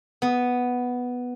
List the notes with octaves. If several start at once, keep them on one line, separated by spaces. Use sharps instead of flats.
B3